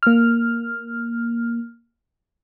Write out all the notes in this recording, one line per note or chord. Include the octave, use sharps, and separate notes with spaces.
A#3 F6